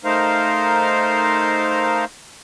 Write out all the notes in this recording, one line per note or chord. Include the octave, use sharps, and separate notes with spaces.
A3 D#4 A#4 C5 F5